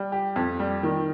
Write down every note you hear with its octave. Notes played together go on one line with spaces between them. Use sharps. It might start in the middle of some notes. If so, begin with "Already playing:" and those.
Already playing: G3
G4
F2
G3
D#3